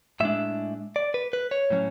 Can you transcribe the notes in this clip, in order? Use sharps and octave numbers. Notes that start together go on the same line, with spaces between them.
A2 G#3 D4 E5
D5
B4
B4
C#5
A2 F#3 C#4